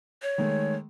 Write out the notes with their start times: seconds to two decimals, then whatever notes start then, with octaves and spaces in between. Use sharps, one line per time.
0.22 C#5
0.38 D#3 G#3 A3